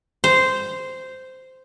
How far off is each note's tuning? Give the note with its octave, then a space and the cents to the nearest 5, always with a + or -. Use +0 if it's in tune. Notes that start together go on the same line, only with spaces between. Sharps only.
C5 -10